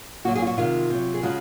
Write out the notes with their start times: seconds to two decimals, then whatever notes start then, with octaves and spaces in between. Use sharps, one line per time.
0.24 A#2 F#3 F#4
0.35 G#4
0.42 F4
0.47 F#4
0.57 C3 D#3 G#3 F4
0.90 C3 F#3
1.14 G#4
1.23 C#3 F3 G#3 F#4